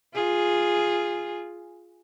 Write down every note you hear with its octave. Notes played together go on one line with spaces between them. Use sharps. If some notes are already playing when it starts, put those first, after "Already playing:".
F4 G#4